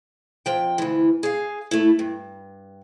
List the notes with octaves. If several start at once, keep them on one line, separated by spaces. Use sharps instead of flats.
F2 F3 G5
D2 E3
G#4 F5
A3 E4
G2